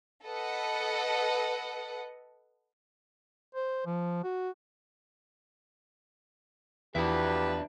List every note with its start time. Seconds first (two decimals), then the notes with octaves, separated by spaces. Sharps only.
0.24 A4 B4 D#5 F#5
3.55 C5
3.86 F3
4.24 F#4
6.95 E2 F3 D4 E4 G4 B4 E5